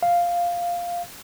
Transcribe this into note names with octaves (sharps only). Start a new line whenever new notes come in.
F5